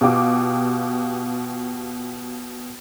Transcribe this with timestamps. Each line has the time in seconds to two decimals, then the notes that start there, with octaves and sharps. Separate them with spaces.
0.01 B2 F4 G4 D6